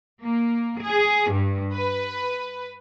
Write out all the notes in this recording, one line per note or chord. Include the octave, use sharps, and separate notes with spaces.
A#3
G#4
G2
B4